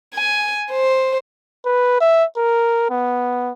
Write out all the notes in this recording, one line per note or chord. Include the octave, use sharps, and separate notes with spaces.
G#5
C5
B4
E5
A#4
B3